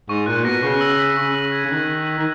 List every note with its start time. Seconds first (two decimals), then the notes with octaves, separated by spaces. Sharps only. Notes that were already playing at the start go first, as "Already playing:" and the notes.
0.09 G#2 C#6
0.26 A#2 F#6
0.45 B2 A#6
0.63 C#3 C#6
0.81 E6
0.99 B6
1.17 C#3 C#6
1.35 E6
1.52 G#6
1.65 C#3
1.71 D#3 F#6
1.88 B6
2.07 F#7
2.19 D#3